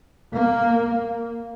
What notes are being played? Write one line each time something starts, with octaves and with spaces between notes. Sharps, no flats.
A#3